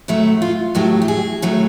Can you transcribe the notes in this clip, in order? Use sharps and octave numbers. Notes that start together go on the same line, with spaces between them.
A2 F#3 A3 E4
F4
A2 F#3 A3 G4
G4
G#4
A2 F#3 A3